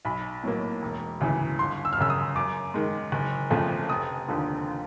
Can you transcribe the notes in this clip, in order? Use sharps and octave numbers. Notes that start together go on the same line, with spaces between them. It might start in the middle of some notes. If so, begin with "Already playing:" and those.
B1 B5
A2 F#3 A#3
E1
D2 C#3 E3
G1 C6
E6
F6
F#2 C#3 E6
D#6
F#2 D6
D#3 G#3
F#1
F2 C#3 F3 A3
F1 D#6
D#2 D3 F3